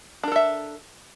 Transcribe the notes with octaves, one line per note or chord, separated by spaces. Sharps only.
D4 A4 A#4 E5